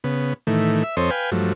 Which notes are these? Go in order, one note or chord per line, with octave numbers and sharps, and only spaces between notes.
C#3 B3
A2 D#3 E3 A3
E5
F2 C4 A4 C#5 D#5 C6
B4 F5 G5 G#5
G2 F3 F#3 A3